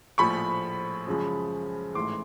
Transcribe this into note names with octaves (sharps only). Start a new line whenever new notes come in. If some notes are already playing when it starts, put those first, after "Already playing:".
A#1 A2 F3 B5 C#6
F#2 C#3 F3 G#3
A1 G#2 E3 A3 C6 D6